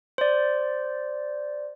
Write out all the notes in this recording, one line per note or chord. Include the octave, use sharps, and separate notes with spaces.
C5 D5